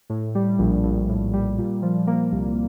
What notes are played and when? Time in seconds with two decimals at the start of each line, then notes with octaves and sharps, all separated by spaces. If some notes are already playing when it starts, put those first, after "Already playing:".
0.10 A2
0.35 G3
0.59 A#1
0.83 A#1
1.09 A2
1.34 G3
1.58 A#2
1.82 F3
2.07 A#3
2.32 C2